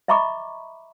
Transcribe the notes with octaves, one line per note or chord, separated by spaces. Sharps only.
D#5 E5 A#5 B5 C#6 D6